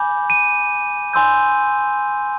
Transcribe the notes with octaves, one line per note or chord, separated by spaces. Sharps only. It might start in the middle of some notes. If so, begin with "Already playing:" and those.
Already playing: G#5 B5 D6 G6
D#7
G#5 C6 E6 G6